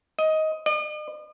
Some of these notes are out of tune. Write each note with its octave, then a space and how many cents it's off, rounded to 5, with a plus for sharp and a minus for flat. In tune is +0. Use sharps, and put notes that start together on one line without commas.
D#5 +15
D#5 -45